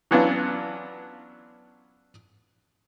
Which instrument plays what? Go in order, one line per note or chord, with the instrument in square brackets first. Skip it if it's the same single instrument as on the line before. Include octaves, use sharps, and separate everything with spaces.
[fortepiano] E3 F#3 B3 C#4 D4 F4